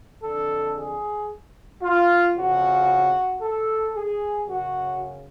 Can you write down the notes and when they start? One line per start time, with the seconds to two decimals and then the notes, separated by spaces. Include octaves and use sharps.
0.24 F2 D3 A4
0.77 G#4
1.83 F4
2.35 F2 C#3 F#4
3.42 A4
3.95 G#4
4.48 F#2 C#3 F#4